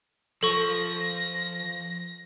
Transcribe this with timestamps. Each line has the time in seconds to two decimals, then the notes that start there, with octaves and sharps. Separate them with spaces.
0.43 F3 A4 C#6 A#6